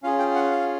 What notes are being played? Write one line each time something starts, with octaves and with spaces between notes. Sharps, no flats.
C#4 F4 G#4 F5
G5
F#5
F5